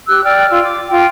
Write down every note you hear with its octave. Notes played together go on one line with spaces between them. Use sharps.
G4 E6 F#6
D5 G5 F6
F4 E6
D6
F4 G5